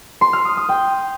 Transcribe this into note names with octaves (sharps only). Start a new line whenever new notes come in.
C6
F6
D#6
D#6
G5